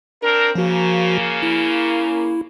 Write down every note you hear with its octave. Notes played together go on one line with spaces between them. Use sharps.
C4 D4 A#4
C#3 F3 A#3 F#4
E4